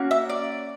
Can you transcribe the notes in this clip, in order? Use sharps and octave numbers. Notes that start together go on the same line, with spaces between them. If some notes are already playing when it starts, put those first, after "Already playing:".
Already playing: A#3 C#4 F#4
E5
D5